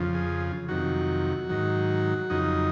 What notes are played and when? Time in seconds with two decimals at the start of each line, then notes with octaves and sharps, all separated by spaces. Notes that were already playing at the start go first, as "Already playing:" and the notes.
Already playing: F2 C#3 F3
0.14 G#4
0.68 F2 C3 D#3 F#3 F#4
1.49 G#2 D#3 F#3
2.30 F2 C#3 F#3 D#4